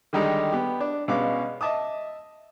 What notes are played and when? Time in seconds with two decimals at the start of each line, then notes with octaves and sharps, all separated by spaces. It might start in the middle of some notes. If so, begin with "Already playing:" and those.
0.13 D3 D#3 G3 G#3 D#4 G4
0.52 B3 G4
0.80 D4
1.08 B2 G#3 C#4 B4 F5 D6
1.61 D#5 E5 A5 D6 D#6